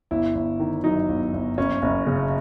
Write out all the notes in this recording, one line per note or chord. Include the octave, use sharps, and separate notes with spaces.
G1 E4
G1
D#3
F#2 D#4
G1
G1
F#1 C#4
F#1
C#3